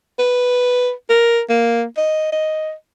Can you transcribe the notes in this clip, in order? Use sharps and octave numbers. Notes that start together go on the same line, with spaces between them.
B4
A#4
A#3
D#5
D#5